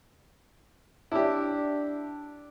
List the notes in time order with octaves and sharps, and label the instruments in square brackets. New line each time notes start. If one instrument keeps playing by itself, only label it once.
[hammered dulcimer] D4 D5 [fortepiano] E4 G4